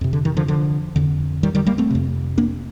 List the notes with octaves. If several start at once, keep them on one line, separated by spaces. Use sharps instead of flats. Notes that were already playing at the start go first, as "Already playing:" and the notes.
F2 C3
D3
D#3
D3 F3
D3 F3
F2 D3
D#3 G3
D#3 G3
G3 A#3
A3 C4
F2 C3
A#3 D4